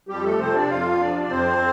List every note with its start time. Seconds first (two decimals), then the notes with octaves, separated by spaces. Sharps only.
0.09 F2 G3 G4
0.24 A3 A4
0.39 C3 F3 C4 C5
0.54 D4 D5
0.70 F2 F4 F5
1.00 C3 F3 D4 D5
1.30 F2 C4 C5